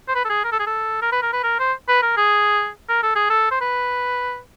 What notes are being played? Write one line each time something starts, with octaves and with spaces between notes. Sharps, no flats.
C5
B4
A4
G#4
A#4
A4
G#4
A4
A#4
B4
A#4
B4
A#4
C5
B4
A#4
G#4
A#4
A4
G#4
A4
C5
B4